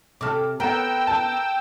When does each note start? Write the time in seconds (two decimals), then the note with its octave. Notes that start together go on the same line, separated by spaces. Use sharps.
0.21 C3 A4 D6 F6
0.60 B3 A#4 F#5 G5 E6
1.07 A5